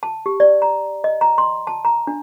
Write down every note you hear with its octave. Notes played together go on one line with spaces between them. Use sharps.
A5
G4
D5
A#5
D#5
A#5
C6
A5
A#5
D4